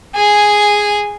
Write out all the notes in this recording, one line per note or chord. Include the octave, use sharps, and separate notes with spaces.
G#4 G#5